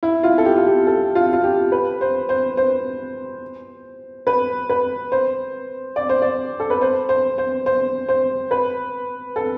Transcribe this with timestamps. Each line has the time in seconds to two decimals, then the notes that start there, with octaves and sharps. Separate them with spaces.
0.03 E4
0.23 F4
0.38 A4
0.45 G4
0.56 F4
0.66 G4
0.87 A4
1.15 F4
1.33 F4
1.44 G4
1.72 B4
2.01 C5
2.29 C5
2.57 C5
4.27 B4
4.69 B4
5.12 C5
5.96 D5
6.09 C5
6.22 D5
6.60 A4
6.70 B4
6.81 C5
7.09 C5
7.38 C5
7.66 C5
8.09 C5
8.51 B4
9.36 A4